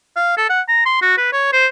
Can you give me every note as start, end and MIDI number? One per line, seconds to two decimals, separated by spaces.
0.16 0.33 77
0.37 0.48 69
0.49 0.61 78
0.68 0.84 82
0.86 1.01 84
1.02 1.17 66
1.18 1.31 71
1.33 1.52 73
1.53 1.67 72